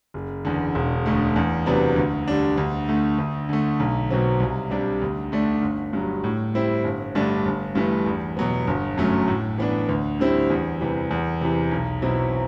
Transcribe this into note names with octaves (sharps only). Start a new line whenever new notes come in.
F#1
E2 D3
E1
D2 D3 A3
E2
C3 F#3 B3 D4
D2
D3 G3 D4
D2
D3 A3
D2
D3 A3
B1
B2 F#3 C4
C2
C3 G3 D4
D2
D3 A3 D4
G1
G2 F#3
A2
G3 C4 E4
G1
G2 D3 A3 D4
G1
G2 E3 A3
E2
B2 F#3 B3
G1
F#2 F#3 A3
A2
E3 B3 D4
D2
D3 G3 C4 E4
E2
C3 E3 G3
E2
C3 E3
B1
B2 F#3 C4 E4